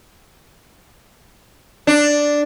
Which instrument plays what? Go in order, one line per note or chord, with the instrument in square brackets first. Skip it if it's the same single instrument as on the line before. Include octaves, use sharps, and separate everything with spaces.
[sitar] D4